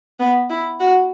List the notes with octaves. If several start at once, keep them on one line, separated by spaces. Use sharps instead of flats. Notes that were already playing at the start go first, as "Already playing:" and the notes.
B3
E4
F#4